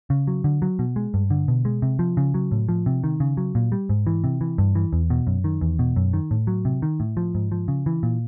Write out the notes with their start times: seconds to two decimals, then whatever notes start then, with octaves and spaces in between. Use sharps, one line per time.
0.10 C#3
0.27 F#3
0.44 D3
0.62 F#3
0.79 B2
0.96 G#3
1.14 G2
1.31 D3
1.48 B2
1.65 G#3
1.82 C3
1.99 F3
2.17 C#3
2.34 F#3
2.52 A2
2.69 F3
2.86 C3
3.04 D#3
3.20 C#3
3.37 F#3
3.55 A#2
3.72 G3
3.89 G#2
4.07 E3
4.24 C3
4.41 E3
4.58 G2
4.75 E3
4.93 E2
5.10 B2
5.27 F#2
5.44 D#3
5.61 E2
5.79 B2
5.96 F#2
6.13 D#3
6.31 A2
6.47 F#3
6.65 C3
6.82 D#3
7.00 A2
7.17 F3
7.35 G#2
7.52 F3
7.68 C#3
7.86 E3
8.03 A#2